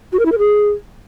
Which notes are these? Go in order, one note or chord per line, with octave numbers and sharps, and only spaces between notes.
F#4
A#4
E4
A#4
G#4